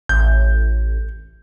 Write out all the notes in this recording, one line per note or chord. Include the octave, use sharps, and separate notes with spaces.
A1 G6